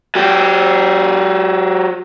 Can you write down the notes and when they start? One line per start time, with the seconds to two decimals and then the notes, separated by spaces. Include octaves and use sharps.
0.15 F#3 G4